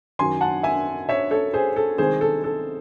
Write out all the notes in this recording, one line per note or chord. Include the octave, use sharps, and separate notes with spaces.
F#2 D#3 F#3 G#5 C6
F#5 A5
E5 G#5
C#5 E5
A4 C#5
G#4 C5
A4
C2 C3 D#3 G#3 G#4 C5
A4
A4